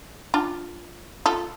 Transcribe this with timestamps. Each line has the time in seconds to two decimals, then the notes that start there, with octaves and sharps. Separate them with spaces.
0.34 D4 F4
1.26 F4 A4